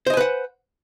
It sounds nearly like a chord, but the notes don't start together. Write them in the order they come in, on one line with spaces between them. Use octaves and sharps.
C5 D#5 G#5 B4 F#5